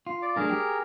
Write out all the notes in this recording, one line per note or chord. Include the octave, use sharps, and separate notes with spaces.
F4
D5 D6
F#3 A3 D4 G#4 A#4 A#5
G4